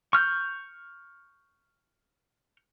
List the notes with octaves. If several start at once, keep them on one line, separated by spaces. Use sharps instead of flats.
C#6 F6 G6